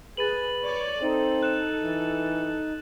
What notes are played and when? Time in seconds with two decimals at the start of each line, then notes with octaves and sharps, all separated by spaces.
0.17 G#4 B4 A6 D#7 F#7
0.64 C#5 D5
1.02 C4 D#4 A4
1.43 F#6 E7
1.83 E3